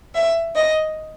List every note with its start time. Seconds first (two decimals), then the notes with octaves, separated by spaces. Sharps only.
0.14 E5
0.55 D#5